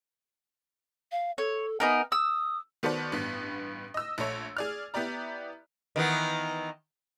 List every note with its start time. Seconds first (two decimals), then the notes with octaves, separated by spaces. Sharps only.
1.12 F5
1.38 A4 C#5
1.80 B3 D#4 A#4 G#5
2.12 D#6 E6
2.83 D#3 B3 F#4 A4 C5 D5
3.12 A1 G2 B3
3.94 D#5 E6
4.18 A#1 A3 C#5
4.57 G#4 D5 F6
4.94 B3 E4 G4 D5 A#5
5.96 D#3 E3 B3